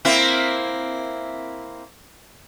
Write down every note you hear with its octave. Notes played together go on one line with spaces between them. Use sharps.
A#3 C4 E4